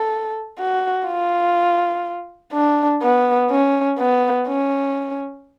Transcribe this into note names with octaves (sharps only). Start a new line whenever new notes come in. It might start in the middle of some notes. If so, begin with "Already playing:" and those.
Already playing: A4
F#4
F4
D4
B3
C#4
B3
C#4